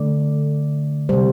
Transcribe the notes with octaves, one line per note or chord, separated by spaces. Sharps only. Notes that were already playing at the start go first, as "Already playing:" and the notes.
Already playing: D3 A3 D5
C3 G3 C5